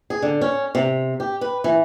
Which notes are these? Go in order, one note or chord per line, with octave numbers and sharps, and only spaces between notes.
G#4
D3
C#4
C3
G4
B4
E3